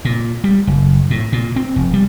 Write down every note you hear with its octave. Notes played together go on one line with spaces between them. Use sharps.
A#2
G3
F#1
A2
A#2
C4
F1
G3